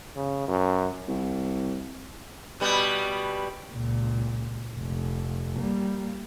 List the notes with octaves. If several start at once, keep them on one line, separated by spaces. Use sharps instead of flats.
C#3
F#2
C2
B2 G3 B3
C#2 A#2
F1
G3 A#3